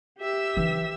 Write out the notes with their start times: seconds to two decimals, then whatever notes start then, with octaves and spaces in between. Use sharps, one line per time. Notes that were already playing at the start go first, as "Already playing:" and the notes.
0.20 G4 E5 E6
0.57 E3 D#4